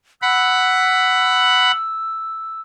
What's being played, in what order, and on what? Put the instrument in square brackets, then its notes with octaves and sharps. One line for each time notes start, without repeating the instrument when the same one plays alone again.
[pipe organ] F#5 B5 [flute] E6